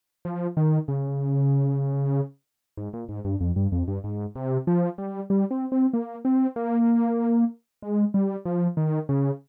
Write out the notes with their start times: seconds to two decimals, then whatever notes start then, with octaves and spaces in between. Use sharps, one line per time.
0.25 F3
0.57 D#3
0.88 C#3
2.77 G#2
2.94 A#2
3.09 G#2
3.25 G2
3.41 F2
3.56 G2
3.72 F2
3.88 G2
4.04 G#2
4.36 C3
4.67 F3
4.98 G3
5.30 G3
5.51 C4
5.72 C4
5.93 A#3
6.25 C4
6.56 A#3
7.82 G#3
8.14 G3
8.45 F3
8.77 D#3
9.09 C#3